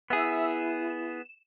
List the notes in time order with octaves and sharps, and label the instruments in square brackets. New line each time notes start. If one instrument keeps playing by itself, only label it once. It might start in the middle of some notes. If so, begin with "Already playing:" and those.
[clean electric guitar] B3 G#4 [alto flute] E4 [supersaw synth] E5 E6
[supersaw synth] E7